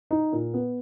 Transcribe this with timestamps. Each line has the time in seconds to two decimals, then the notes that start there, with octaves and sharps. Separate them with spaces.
0.11 D#4
0.33 A#2
0.54 B3